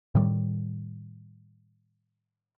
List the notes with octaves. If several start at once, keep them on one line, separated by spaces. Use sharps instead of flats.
A2 D#3 G3